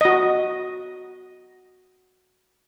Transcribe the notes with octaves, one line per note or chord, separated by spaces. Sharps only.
F#4 D#5